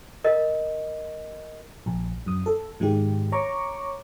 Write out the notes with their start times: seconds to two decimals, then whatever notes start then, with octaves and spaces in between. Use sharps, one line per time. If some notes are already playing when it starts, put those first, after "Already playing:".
0.24 A#4 D#5
1.86 A#1
2.26 F#2 D#6
2.46 A4
2.80 G#2 D#3 G#3 G4
3.32 C#5 A#5 C#6 D6